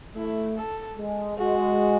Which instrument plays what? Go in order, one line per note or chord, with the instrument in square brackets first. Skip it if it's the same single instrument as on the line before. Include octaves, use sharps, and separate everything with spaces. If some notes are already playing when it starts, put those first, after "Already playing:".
[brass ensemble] A3 [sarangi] E4
[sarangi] A4
[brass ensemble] G#3
[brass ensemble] G#3 [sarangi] F#4